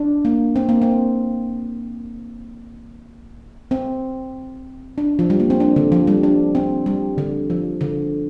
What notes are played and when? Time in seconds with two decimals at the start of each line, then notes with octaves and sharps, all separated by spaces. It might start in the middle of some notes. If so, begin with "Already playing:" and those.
Already playing: D4
0.25 A#3
0.56 C4
0.69 A#3
0.82 C4
3.71 C4
4.98 D4
5.19 F3
5.30 G3
5.40 A#3
5.50 C4
5.60 D4
5.76 D3
5.92 F3
6.07 G3
6.23 D4
6.55 C4
6.86 G3
7.18 D3
7.50 F3
7.81 D3